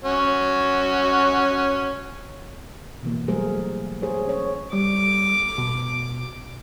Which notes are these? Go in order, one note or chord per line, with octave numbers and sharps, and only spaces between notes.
C#4 F#4
B2 E3 A#3
F#3 G3 A3 G#4 A#4 C5
G#4 C5 C#5
C#4 C#5
G3 D6
B2